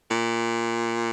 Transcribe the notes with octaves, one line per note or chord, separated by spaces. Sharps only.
A#2